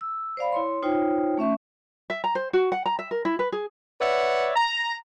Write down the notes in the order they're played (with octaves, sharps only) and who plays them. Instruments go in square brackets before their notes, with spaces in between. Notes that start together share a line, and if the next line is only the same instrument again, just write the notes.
[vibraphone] E6
C5 D5 F5 B5
E4 C#5 C6
D#4 F4 C5 C#5 G5
A3 C#4 E5 C#6
[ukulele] E5
A#5
C5
F#4
F#5
A#5
E5
A#4
E4
B4
G#4
[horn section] B4 C#5 D5 E5 F#5
A#5